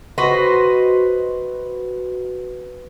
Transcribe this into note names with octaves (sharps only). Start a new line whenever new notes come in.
F#4 B4 C5 D#5